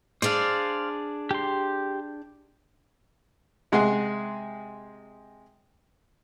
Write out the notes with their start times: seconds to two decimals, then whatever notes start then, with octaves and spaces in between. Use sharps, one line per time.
0.22 D4 G#4 C5 D5 F5
1.31 G4 C6
3.72 C3 G#3 G#4 F#5 C6